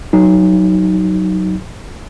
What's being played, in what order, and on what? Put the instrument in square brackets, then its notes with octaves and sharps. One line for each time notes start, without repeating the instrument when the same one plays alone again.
[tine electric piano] F#3 D#4